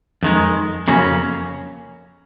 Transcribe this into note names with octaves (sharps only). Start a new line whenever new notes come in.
F2 D#3 G#3
F2 C#3 F#3 A#3 C#4